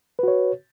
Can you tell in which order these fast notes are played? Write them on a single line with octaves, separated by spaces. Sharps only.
B4 F#4 C#5